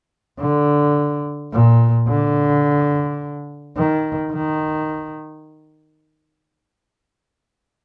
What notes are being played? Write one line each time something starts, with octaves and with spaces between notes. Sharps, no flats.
D3
A#2
D3
D#3
D#3